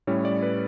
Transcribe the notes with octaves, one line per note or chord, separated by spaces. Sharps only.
A2 G3 C#4 E4 C#5
D5
B4